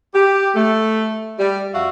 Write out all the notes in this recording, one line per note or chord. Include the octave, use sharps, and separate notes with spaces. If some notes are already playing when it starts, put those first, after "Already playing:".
G4
A3
G3
F2 F#4 E5 F5